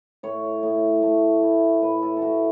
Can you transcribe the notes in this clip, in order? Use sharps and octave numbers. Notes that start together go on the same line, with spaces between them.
A2 C#5
A2
A3
E4
A2 B4
A4
A4
A2 F#4